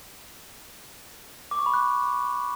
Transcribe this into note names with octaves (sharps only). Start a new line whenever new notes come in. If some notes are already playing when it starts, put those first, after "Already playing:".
D6
C#6
B5
F#6